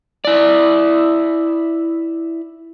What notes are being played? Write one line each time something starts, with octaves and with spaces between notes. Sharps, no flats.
E4 D5